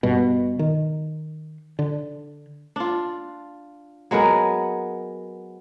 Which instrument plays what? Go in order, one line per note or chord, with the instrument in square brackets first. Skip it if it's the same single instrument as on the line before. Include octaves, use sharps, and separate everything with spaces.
[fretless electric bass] G2 B2
D#3
D3
[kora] D4 F4
F#3 G#3 B3 A#4